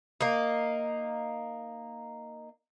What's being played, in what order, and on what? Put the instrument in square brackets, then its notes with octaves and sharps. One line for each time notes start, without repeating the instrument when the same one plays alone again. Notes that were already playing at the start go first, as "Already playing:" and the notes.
[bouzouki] A#3 D#4